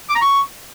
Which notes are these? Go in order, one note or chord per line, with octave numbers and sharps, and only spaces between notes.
D6
A#5
C#6